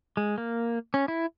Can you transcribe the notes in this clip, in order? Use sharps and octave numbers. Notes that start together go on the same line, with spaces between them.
G#3
A#3
C#4
E4